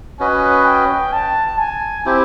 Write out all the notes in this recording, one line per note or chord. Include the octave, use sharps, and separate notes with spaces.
C#4 F#4 B4 D#5 G#5
G5
A5
G#5
C4 E4 G4